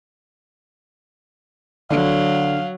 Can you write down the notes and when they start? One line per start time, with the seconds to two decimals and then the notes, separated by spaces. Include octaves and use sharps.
1.90 D3 F#3 F5